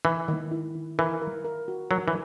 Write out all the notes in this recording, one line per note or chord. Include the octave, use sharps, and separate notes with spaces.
E3 E4
D#3
E4
D#3
E3 A#4
A#4
A#4
F#4
F#3 A#4
E3